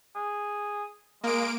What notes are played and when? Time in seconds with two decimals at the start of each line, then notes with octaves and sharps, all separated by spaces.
0.15 G#4
1.24 G#3 A#3 D7